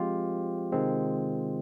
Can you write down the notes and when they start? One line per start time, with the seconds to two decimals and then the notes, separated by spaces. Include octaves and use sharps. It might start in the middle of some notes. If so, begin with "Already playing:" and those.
Already playing: F3 G#3 C4 F4 G4
0.72 C3 D#3 G#3 C4